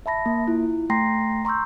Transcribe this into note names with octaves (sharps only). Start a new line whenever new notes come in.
E5 A5 B5 A#6
A#3
E4 F4
A3 G5 A#5 C6 A#6 C7
A#5 C6 C#6 E6 G6